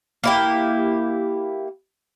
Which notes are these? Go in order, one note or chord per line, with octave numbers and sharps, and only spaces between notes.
A#3 E4 G4